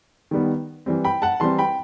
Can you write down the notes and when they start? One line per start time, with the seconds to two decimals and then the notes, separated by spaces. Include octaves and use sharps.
0.31 D#3 G3 B3
0.86 E3 G3 C4
1.04 G5 B5
1.22 F#5 A5
1.40 E3 G3 C4 A5 C6
1.59 G5 B5